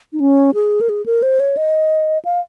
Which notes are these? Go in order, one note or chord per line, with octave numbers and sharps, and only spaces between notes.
D#4
C#4
G#4
A#4
G#4
A#4
C5
C#5
D#5
F5